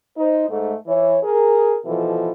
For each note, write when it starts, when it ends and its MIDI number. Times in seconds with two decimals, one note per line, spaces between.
0.17 0.48 63
0.17 0.48 72
0.49 0.74 44
0.49 0.74 57
0.87 1.18 52
0.87 1.18 73
1.24 1.78 68
1.24 1.78 70
1.85 2.31 47
1.85 2.31 52
1.85 2.31 53
1.85 2.31 69